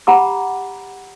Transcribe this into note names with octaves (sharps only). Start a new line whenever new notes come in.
G4 F#5 A#5 B5 D6